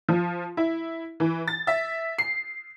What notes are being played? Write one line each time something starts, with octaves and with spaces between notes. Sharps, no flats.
F3
E4
E3
A6
E5
C7